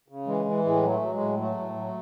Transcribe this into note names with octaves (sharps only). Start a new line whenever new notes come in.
C#3
E3 G#3
E3
A2 G#3
F#3
A3
F#3
G#3
A2
F#3 A3
A2
F#3